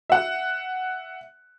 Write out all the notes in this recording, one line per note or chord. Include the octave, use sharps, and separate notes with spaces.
E5 F#5